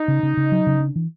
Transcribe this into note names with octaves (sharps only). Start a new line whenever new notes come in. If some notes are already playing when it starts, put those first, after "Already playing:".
Already playing: D#4
C#3
C#3
C#3
F#3
C#3
D4
E3